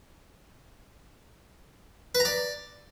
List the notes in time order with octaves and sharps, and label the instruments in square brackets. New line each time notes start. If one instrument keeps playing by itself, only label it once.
[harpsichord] B4
A#5
D5